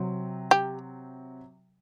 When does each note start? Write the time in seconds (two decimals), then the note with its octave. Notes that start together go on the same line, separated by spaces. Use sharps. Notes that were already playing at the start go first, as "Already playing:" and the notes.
Already playing: C3 F#3 C4
0.51 G4